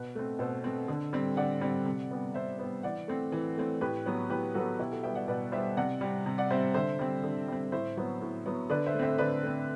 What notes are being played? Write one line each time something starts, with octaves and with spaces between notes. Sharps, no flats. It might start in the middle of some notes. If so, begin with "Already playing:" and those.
Already playing: B2 B4
A3 C4
B2 A4 C5
A3 C4
D3
G3 C4
D3 D5 F#5
G3 C4
C3
G3 B3
C3 C5 E5
G3 B3
E3 D5 F#5
A3 C4
E3
A3 C4
A2 G4 B4
F#3 B3
A2 G4 B4
F#3 B3 F#4 A4
B2 E4 G4
F#4 A4
G3 B3 E5 G5
D5 F#5
B2 B4 D5
G3 B3 C5 E5
C3 D5 F#5
G3 C4
C3
D5 F#5
G3 C4 C5 E5
D3 C5 E5
G3 C4
D3
G3 C4
A2 C5 E5
F#3 B3
A2
F#3 B3
D3 B4 D5
C5 E5
A3
C4 C5 E5
D3 B4 D5
A3 C4